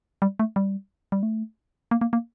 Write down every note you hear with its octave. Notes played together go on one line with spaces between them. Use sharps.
G3
A3
G3
G3
A3
A#3
A#3
A#3